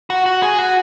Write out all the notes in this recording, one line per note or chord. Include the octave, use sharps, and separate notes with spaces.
F#4
F#4
G#4
F#4